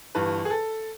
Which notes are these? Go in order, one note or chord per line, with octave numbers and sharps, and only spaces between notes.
G1 G2 E3 B4
G#4
A4